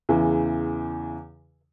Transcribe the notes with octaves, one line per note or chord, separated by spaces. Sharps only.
E2 C#3 E3